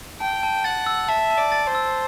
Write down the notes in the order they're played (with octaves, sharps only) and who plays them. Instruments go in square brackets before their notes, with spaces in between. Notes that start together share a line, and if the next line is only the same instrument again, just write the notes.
[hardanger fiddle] G5 [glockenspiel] A5
[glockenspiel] A5
[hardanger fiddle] F#5 [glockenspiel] A6
[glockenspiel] E6
[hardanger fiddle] E5 [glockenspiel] A5
[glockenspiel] A5
[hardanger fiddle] D5
[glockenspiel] A6
[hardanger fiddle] C5
[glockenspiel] E6